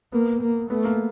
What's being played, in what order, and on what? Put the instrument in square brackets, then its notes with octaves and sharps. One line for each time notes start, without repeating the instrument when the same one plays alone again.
[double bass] A#3 [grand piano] B3
[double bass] A#3
[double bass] A3 [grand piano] B3
[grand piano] A#3